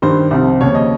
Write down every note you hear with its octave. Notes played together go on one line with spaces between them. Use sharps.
G2 D#3 C5
C2 C3 F3
D#2 C#3 F3 C#5
D#5